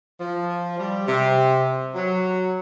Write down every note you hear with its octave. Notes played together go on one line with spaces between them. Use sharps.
F3
G3
C3
F#3